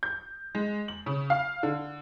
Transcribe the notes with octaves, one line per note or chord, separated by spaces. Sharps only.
G6
G#3
F#7
C#3
F5
D3